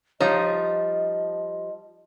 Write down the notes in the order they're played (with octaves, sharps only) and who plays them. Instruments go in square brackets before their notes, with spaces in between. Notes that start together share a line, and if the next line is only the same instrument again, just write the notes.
[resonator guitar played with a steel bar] F3 G3 [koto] D#4 [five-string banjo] C#5 F5 [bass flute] D#5